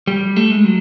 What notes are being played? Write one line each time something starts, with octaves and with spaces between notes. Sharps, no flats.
G3
A3
G#3
F#3